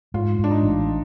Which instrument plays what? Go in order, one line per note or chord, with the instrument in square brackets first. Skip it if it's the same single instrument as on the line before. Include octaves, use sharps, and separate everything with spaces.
[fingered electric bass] G#2 [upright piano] F4
[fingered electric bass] G#2 [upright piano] D4
[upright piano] D#4
[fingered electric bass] A1